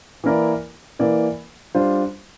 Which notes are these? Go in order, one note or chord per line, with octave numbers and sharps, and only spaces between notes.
E3 A#3 E4 A#4 D5
E3 A#3 E4 A#4 D5
G3 D4 F4 C5